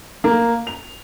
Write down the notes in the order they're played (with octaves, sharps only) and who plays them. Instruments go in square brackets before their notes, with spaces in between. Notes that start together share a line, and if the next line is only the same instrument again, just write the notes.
[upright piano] A#3
F7